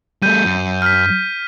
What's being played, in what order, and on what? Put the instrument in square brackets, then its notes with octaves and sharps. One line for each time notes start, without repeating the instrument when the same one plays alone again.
[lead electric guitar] G3 A3 [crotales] G6 D#7
[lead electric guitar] F#2
[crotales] F6 B6